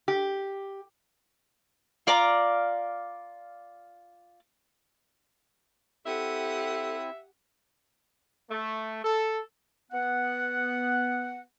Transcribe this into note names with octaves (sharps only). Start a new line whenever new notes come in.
G4
F4 D5 F5 A#5
C4 E4 G4 A4 E5 F#5 D#6
A3
A4
B3 F#5